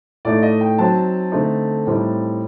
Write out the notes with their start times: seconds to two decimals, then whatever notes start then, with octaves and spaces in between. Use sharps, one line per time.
0.25 A2 A3 D#4 D5
0.43 D#5
0.61 G5
0.78 F#3 C4 D#4 A5
1.32 D3 A3 C4 D#4
1.87 A2 G3 C4 D#4